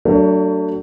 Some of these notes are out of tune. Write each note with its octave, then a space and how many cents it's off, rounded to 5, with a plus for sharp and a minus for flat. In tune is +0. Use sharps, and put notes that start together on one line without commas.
F#3 +30 A3 +35 D4 +0